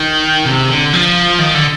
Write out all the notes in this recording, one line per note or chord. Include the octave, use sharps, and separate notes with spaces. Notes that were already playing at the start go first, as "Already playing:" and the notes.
Already playing: D#3
C3
D3
F3
D#3
D3